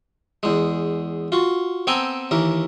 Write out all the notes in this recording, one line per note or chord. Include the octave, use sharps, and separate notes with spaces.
E2 G#3
F4 F#4
B3 C4 A4 G5 G#5 A#5
D#2 E3 A#4